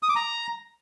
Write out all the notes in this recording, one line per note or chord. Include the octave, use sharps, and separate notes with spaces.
D#6
D6
A#5